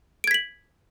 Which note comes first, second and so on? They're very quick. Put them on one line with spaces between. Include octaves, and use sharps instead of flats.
D7 G#6 B6 F#7